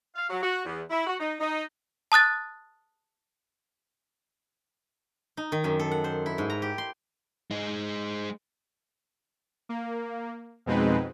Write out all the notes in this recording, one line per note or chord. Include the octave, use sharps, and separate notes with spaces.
F5
F#3
F#4
E2
E4
F#4
D#4
D#4
A5 D#6 F#6 A6
D#4
D#3
F#2
A4
F#5
C5
E4
G#2
A#5
G4
C6
G#3 D#4
A#3
F2 B2 G#3 C4 D#4 B4